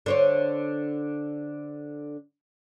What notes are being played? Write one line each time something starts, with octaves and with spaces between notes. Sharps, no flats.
D3 C5 C#5